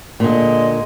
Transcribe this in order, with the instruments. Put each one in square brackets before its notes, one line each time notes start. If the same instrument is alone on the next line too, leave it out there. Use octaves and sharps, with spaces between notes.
[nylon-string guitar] A#2 D3 [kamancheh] G#3 D#5